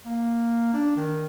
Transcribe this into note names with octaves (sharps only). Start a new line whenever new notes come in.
A#3
D4
D#3